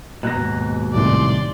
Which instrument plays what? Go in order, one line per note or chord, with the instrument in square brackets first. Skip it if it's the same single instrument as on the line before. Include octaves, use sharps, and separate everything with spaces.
[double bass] D#2 G#2 [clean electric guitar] B2 A#5 [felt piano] F#6
[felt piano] C2 A2 D#3 [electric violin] D5 C6